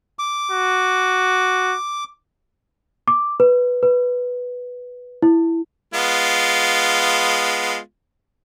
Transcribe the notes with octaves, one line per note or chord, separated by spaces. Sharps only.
D6
F#4
D6
B4
B4
E4
G#3 B3 F4